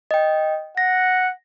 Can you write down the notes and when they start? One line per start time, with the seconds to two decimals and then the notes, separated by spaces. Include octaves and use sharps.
0.11 D#5 G5
0.77 F#5 A#6